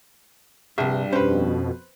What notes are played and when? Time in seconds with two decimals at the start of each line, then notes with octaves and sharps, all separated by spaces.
0.78 A#1 G2 C3 E5
1.12 F2 B2 C#4 B4 C5